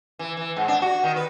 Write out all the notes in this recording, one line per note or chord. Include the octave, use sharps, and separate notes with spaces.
E3
E3
G#2
D4
F#4
D#3
B4